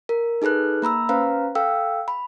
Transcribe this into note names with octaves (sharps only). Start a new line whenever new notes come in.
A#4
D#4 G#4 A4 B4 F#6
A#3 A#5 B5 E6
C#4 B4 C5 F5 A#5
A4 F5 G5 E6
B5